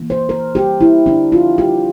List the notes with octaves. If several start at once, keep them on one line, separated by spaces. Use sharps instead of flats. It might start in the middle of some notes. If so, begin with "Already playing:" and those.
Already playing: E3 A#3
C5
A#4
G4
E4
D4
F4
G4